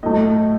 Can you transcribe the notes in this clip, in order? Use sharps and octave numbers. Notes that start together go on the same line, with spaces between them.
A2 F#3 A3 D#5